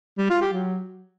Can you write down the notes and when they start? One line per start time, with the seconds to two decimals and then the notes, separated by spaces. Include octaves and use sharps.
0.18 G3
0.30 F4
0.42 G4
0.53 F#3